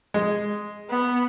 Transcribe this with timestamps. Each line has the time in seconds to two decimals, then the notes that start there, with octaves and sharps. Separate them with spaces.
0.14 G#3
0.90 B3